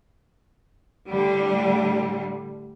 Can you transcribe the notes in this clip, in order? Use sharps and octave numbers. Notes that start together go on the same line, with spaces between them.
A2 D3 G3